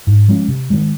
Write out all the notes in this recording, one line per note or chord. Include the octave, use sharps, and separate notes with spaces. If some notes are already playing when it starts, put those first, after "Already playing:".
G#2
F3 G#3 C#4
C3
D#3 G#3